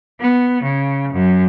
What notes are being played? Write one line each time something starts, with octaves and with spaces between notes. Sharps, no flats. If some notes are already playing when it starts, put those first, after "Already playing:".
B3
C#3
F#2